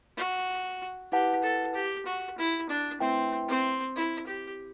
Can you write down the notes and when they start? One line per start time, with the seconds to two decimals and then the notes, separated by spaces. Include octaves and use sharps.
0.17 F#4
1.12 E4 G4 B4 F#5 A5
1.43 A4
1.75 G4
2.06 F#4
2.38 E4
2.70 D4
3.00 A3 C4 E4 B4 E5 G5
3.48 C4
3.96 E4
4.27 G4